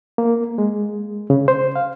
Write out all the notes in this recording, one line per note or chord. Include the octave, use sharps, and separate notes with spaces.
A#3
G#3
C#3
C5
F5